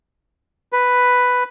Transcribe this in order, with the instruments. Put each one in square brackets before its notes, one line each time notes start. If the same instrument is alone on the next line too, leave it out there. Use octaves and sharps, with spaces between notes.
[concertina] B4